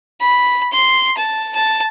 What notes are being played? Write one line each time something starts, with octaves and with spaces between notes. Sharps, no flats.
B5
C6
A5
A5